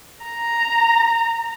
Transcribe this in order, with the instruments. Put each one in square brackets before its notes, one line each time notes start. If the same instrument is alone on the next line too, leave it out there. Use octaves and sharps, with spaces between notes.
[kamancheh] A#5